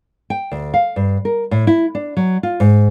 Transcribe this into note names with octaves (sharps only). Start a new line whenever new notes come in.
G5
D2
F5
G2
A#4
A2
E4
D4
F#3
F4
G#2